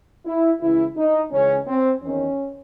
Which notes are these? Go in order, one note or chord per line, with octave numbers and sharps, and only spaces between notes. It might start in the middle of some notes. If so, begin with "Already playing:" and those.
E4
C#2 C#3 E3 E4
D#4
C#2 C#3 E3 C#4
C4
E2 D#3 C#4